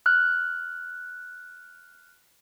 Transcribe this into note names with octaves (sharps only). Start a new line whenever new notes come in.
F6 F#6